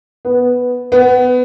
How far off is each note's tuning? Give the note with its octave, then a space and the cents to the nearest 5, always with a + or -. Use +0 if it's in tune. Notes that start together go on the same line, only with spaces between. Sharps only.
B3 +0
B3 +20